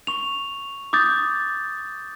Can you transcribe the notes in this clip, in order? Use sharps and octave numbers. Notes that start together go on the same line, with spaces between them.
C#6 F7
D6 D#6 G6 A6